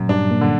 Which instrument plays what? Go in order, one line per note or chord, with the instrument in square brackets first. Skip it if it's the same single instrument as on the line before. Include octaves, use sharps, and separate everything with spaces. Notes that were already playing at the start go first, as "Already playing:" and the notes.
Already playing: [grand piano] F#2 [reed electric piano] A#2
[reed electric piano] G2 G3 [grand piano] D4
[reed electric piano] A#2 A#3
[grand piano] D3